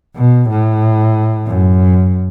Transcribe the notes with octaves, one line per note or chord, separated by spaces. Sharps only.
B2
A2
F#2